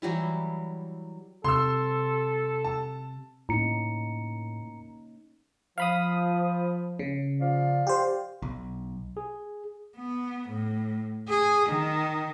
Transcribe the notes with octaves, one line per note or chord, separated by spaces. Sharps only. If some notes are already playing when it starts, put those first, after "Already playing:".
E3 F#3 G3 E4
C3 A4 C6 E6
A5
A2 A#3 C#4 D#4 A#5 C#7
F3 F5 B5 D#6
C#3
F3 D5 F5
G4 C5
B1
G#4
B3
A2
G#4
D#3